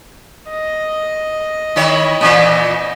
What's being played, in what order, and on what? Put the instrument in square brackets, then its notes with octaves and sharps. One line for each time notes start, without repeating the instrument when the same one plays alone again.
[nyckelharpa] D#5
[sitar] D#3 E4 C#5
A#2 E3 C4